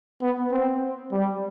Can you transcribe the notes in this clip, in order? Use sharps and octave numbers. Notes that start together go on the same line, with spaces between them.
B3
C4
G3